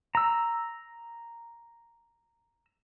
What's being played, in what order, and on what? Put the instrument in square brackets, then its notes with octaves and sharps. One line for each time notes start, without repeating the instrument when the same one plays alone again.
[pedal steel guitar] A#5 E6